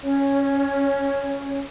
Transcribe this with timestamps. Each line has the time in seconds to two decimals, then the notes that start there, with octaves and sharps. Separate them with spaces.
0.03 C#4 C#5